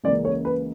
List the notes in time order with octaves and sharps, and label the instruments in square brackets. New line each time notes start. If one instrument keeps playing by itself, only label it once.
[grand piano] C#2 C#3 E3 A#3 D5
C#5
B4